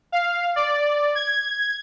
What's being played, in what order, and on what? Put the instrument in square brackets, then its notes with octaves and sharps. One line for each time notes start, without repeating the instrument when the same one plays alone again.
[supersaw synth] F5
D5
G#6